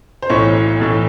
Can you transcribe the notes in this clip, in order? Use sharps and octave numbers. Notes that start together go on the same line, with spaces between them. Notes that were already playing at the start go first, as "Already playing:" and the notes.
C5
B1 A2 E3 C#5
B1 A2 E3